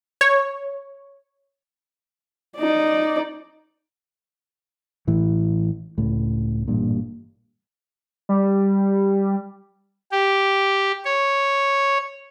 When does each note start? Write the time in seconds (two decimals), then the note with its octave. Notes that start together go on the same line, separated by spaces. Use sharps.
0.21 C#5
2.58 D#4 D5
5.07 A1 A2 E3
5.98 C#2 A2
6.68 A1 G2 A#2
8.29 G3
10.12 G4
11.05 C#5